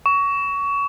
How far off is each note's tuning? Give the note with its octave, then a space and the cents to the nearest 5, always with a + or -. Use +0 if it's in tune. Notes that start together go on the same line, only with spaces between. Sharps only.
C#6 +25